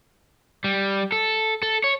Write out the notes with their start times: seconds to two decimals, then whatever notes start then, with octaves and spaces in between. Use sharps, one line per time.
0.64 G3
1.12 A4
1.63 A4
1.84 C#5